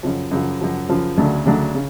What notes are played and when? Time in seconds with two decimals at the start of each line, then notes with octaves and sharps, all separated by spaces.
0.03 F#2 C#3 F3
0.31 F#2 C#3 F3
0.61 F#2 C#3 F3
0.89 F#2 C#3 F3
1.17 D2 C#3 F#3 A3 D4
1.46 D2 C#3 F#3 A3 D4
1.75 C#3